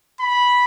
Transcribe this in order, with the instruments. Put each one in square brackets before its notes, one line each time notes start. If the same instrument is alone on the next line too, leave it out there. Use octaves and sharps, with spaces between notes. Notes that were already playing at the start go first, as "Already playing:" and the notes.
[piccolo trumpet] B5